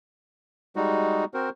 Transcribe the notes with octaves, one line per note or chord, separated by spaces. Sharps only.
G3 G#3 D#4 F#4
C4 F#4 A#4 C5